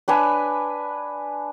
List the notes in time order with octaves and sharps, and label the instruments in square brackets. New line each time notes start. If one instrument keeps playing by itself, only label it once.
[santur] D4 B4 G#5 B5